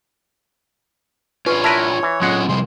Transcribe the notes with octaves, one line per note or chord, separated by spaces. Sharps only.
C#4 D4 F4 B4 C#5
E4 A#4 B4 A5
E3
F#3 G#3 C#4 F4 F#5
C3 F3 G3 C6